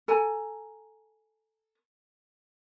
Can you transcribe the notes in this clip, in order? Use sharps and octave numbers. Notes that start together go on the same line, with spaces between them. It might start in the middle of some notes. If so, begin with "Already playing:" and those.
A4 G#5 A#5